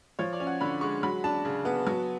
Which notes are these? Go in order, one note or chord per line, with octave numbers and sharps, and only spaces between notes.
F3 C#5
D5
C#4
F#5
D3 B5
G#3 C#6
F#3 B5
D4 A5
C#3
B3
F#3